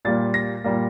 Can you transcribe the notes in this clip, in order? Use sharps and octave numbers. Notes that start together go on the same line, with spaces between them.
A#2 G3 A#3 A6
A#6
A#2 G3 A#3